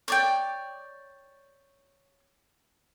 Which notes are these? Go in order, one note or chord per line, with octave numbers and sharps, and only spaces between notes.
C#5 D5 G5